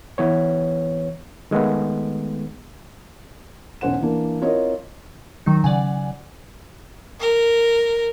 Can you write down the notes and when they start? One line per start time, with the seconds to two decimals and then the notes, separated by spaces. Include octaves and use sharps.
0.18 E3 B3 C#5
1.51 D#3 G#3 A3 B3
3.81 B1 E2 C#4 C5 F#5 E7
4.01 E3 A#3 D4
4.41 C4 E4 F4 A#4 C#5 D#5
5.46 D#3 F#3 D#4
5.64 C#3 F#3 D5 F#5 G#5
7.20 A#4